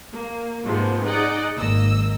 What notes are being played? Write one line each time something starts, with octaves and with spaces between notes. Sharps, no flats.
A#3
G#2 C3 F3 G#3 A#3 B3
D#4 G#4 D5 D#5 F#5
G#1 A#3 D#5 E6